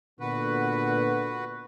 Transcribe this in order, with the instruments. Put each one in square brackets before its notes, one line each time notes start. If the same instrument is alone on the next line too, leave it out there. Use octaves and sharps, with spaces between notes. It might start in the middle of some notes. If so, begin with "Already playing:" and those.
[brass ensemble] A#2 D3 B3 [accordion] F#4 B4